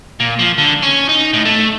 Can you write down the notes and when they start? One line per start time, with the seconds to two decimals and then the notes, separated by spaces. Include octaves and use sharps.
0.20 A#2
0.39 F3
0.58 D3
0.82 C#4
1.09 D#4
1.33 A2
1.45 A3